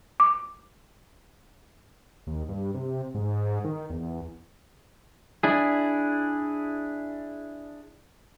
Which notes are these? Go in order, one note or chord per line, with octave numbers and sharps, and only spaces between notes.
D6
D#2
G2
C3
G#2
D#3
E2
D4 E4 G#4